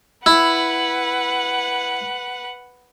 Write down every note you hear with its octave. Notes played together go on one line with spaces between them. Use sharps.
E4 B4 F#5